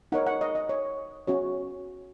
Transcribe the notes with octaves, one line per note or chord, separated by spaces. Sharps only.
D#4 A#4 C#5 F#5
F#5
D#5
D#5
C#5
C#4 F#4 C#5